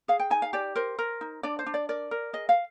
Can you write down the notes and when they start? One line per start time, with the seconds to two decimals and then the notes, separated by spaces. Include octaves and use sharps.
0.08 G#4 F5
0.19 G5
0.30 D#4 G#5
0.42 F5
0.53 G4 D5
0.75 A#4 C5
0.99 A#4
1.21 D#4
1.43 D4 D5
1.59 C5
1.66 D4
1.74 D5
1.89 A#4 D5
2.11 A#4
2.33 G#4 D#5
2.49 F5